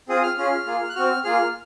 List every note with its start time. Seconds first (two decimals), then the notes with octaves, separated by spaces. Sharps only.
0.09 C4 F4 G#4 D#6
0.23 F6
0.37 C#4 F4 G#4 F6
0.66 A#3 F4 G#4
0.89 F#6
0.95 C4 F#4 F6
1.24 A#3 F4 G#4 F6